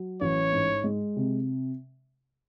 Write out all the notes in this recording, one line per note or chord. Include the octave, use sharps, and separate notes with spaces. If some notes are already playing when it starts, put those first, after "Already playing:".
Already playing: F#3
A1 C#5
G#2
G#3
C3